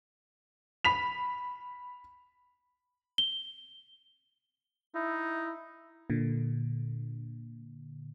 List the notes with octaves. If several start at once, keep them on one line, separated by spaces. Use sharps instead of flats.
B5 B6 F7
G7
D#4 E4
A#2 D3